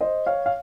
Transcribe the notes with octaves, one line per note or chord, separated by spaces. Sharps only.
C5 D#5
C#5 F5
F5